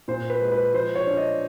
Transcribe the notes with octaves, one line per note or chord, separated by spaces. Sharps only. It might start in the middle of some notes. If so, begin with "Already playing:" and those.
A#2 C5
B4
G#3
B4
F3 C5
C#5
D4
D#5